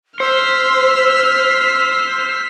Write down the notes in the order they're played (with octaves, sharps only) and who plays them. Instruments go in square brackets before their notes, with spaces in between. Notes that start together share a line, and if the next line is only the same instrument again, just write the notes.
[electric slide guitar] C5 [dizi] E6 [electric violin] F6 B6